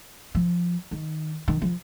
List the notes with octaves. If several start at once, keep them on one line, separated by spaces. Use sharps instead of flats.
F3
D#3
D#3
F3